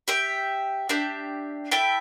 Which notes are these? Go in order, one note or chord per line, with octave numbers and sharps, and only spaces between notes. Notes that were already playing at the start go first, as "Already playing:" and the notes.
G4 E5 G5
D4 G4 E5
E4 A4 E5 G5